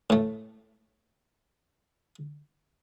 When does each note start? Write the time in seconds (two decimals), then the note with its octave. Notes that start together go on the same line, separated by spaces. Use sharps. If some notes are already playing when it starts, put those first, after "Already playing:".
0.10 A2 A3